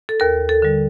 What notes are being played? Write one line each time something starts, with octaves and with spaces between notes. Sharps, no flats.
A4
D#2 A#4
A4
D3 G3